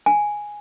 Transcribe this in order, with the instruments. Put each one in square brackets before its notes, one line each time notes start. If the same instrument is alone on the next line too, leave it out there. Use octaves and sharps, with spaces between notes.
[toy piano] G#5